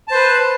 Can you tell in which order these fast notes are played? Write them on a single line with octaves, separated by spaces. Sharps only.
A5 C5 B4